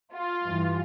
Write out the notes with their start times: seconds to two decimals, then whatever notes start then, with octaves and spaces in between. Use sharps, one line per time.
0.13 F4
0.43 G2 E3